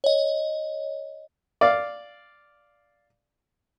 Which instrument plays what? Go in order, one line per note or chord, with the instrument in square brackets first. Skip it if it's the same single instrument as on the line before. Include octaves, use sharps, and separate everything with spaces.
[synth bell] C#5 D#5
[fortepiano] D5 F5